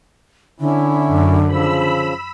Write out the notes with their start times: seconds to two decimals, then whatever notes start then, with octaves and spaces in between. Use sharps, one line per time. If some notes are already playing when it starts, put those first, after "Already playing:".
0.60 D3 C#4 E4
1.07 F#2
1.46 C#3 F3 B5 E6